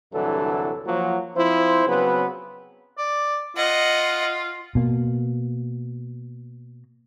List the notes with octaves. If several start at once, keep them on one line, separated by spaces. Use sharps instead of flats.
C2 G2 D3 E3 F#3 A4
F3 F#3 A#3
F3 C4 E4 C5
C#3 F#3 B3 C4 B4
D5
F4 D#5 F#5
B2 A#3